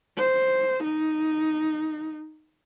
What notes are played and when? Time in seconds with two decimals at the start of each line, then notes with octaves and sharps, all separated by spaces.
0.18 C5
0.84 D#4